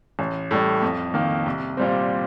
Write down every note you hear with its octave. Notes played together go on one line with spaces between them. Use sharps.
A1
A2 G3
F2
D#3 A#3
C2
A#2 G3 C4